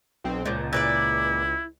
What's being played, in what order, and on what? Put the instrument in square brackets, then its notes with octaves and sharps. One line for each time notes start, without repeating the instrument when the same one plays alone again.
[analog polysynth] B1 C4
[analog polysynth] C#2 [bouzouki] A#2 F3
[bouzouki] A#2 B4 D5 [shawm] E4